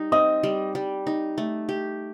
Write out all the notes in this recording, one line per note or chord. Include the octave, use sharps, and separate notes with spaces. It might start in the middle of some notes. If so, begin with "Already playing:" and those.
Already playing: G3 D#4
C4 D#5 D#6
G3
G3
D#4
A3
G4